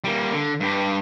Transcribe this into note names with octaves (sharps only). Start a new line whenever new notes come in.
G3 A#3
D3
G2 G4